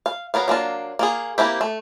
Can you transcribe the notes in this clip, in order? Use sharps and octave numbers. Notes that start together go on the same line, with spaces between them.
F5
F#3 B3 A#4 F5
F#3 A#3 D4 F4
A#3 F4 G#4
A#3 C4 E4 G4
A3